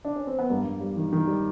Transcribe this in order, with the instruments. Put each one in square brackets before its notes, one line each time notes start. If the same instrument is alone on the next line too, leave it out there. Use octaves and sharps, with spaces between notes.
[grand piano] D4
C#4
C4
B3
G2 A#3
G2
G3
D#3
D#3
G3